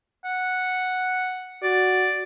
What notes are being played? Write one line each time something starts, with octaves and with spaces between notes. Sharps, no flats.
F#5
F#4 D5